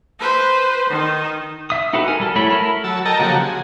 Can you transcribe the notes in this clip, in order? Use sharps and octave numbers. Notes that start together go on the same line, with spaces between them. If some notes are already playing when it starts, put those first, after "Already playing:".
B4 C5
D#3 D#4
E5 D#6
D#4 F#4 G4 A4 B4
A#4 G#5
G3 A4
F#3 A3 E4 C#5 B5
E4 A4 A#4 B5
F#3 A5 E6
A4 A#4 D#5 G5 A5 A#5
C#3 F3 F#3 A#3 F#4 G4
G#4